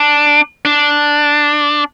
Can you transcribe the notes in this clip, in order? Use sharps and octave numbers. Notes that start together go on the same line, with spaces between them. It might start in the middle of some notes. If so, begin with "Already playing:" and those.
Already playing: D4
D4